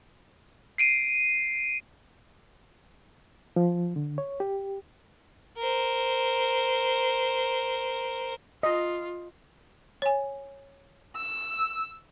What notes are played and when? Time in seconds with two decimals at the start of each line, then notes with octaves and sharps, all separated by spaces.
0.78 C7 D7 D#7
3.56 F3
3.96 D3
4.18 C#5
4.40 G4
5.58 A#4 C5
8.63 F4 D#5
10.02 C#5 G#5
11.16 E6